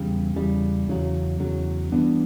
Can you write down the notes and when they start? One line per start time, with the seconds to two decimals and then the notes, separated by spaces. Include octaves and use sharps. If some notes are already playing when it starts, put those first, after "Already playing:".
Already playing: E2 C#3 G3
0.36 E2 C#3 G3
0.88 E2 C#3 F#3
1.40 E2 C#3 F#3
1.92 G2 E3 B3 D4